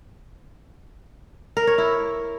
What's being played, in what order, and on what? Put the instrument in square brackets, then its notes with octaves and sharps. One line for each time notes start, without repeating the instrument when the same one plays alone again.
[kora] A#4
C#5
E4